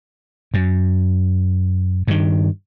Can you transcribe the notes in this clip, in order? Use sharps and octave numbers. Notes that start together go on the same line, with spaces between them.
F#2
G2 D#3